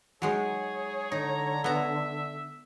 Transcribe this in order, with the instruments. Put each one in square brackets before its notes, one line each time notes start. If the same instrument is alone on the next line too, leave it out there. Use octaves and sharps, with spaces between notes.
[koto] F#3 G#3 D#4 [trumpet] G#4 [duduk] C#5
[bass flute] D3 [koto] D#4 [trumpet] A#5
[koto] B3 A#5 [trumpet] E5